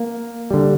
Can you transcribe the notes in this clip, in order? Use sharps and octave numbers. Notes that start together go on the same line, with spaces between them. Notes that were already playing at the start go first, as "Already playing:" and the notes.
Already playing: A#3
D3 G3